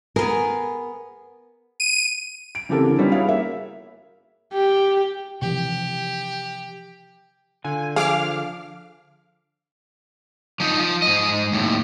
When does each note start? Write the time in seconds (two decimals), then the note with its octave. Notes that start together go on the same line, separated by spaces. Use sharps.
0.16 B3 G#4 A#4
1.80 D#7
2.55 D7
2.69 C#3 E3 C4 G4 A4 A#4
2.87 D3 E3
2.99 G3 B3 C#4 D#4 F4
3.12 E4 F#4 G#4 C#5 F5
3.28 A#3 E5
4.54 G4
5.42 C3 E3 F3 G4
7.64 D3 F4 G#5
7.96 F3 G#4 F5 D6 F6
10.60 F3 D#4
10.79 F3
11.02 G#2 D#5
11.52 D#2 A2